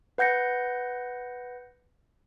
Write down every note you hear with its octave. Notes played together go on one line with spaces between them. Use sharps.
B4 F#5 G6 A#6 C#7